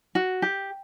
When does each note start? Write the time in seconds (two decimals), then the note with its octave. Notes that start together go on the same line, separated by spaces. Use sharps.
0.15 F#4
0.42 G4